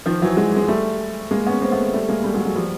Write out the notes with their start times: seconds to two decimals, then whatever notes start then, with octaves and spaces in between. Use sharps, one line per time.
0.06 D#3 F3
0.22 E3 F#3
0.37 F#3 G#3
0.56 G#3
0.68 G3 A3
1.31 G#3 A#3
1.47 B3 C#4
1.62 A#3 C4
1.72 A3 B3
1.93 G3 A3
2.08 G#3 A#3
2.24 G3 A3
2.34 F#3 G#3
2.45 F#3 G#3
2.56 F3 G3